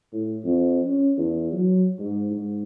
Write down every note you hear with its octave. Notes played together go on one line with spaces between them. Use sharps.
A2
F2
C#4
E2
F#3
G#2
G#2